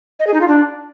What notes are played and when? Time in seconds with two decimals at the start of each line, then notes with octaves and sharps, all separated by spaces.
0.19 D#5
0.27 G#4
0.34 D#4
0.41 F4
0.48 D4